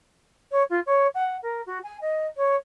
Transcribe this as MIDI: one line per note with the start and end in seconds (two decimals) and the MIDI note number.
0.51 0.63 73
0.70 0.80 65
0.86 1.07 73
1.15 1.37 78
1.43 1.62 70
1.66 1.79 66
1.83 1.98 80
2.01 2.27 75
2.37 2.56 73